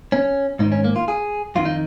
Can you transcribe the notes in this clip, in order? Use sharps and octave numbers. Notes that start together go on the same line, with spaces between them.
C#4
G#2 D#3 D#4
C#4
A#3
F4
G#4
F2 D#3 F4
D#4